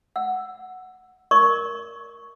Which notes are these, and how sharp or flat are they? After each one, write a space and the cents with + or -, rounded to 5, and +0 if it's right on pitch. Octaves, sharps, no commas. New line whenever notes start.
F#5 +0 E6 +10
A#4 +10 D#5 -45 C#6 +0